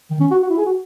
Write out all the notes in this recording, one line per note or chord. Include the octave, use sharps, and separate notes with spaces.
D#3
C#4
F#4
F#4
E4
G#4
F#4